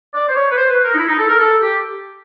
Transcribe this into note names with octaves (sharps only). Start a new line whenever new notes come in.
D5
C5
C#5
B4
C5
B4
A#4
D#4
E4
D#4
A4
A#4
A4
G4